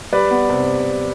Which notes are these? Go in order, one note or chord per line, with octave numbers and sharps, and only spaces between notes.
G3 B4 D5
B3
C3